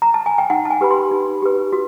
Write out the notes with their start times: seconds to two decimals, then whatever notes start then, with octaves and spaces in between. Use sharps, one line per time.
0.02 A#5
0.14 A5
0.26 G#5
0.38 G5
0.50 D#4 F#5
0.65 A5
0.71 G#5
0.81 G4 B4 B5
0.91 C6
1.11 D#4
1.42 G4 B4
1.73 F#4